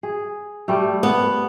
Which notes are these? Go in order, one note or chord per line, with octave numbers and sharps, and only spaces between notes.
G#4
G3 A3
B3